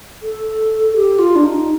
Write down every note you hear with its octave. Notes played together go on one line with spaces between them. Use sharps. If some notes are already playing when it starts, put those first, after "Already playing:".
A4
G4
F4
D4
D#4